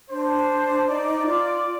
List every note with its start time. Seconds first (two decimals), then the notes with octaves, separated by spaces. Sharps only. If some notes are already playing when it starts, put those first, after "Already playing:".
0.10 D4 C5
0.88 D#4 D5
1.27 F4 D5